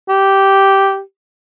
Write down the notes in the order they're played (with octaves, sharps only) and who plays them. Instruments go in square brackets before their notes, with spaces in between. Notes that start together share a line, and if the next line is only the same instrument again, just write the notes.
[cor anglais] G4